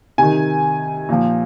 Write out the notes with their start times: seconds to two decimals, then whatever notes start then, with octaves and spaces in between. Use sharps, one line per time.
0.18 C3 D#3 G#5
1.09 A#2 F3